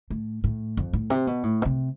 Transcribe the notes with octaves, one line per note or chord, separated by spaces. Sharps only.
A2
A2
F2
A2
C3
B2
A2
B2
C3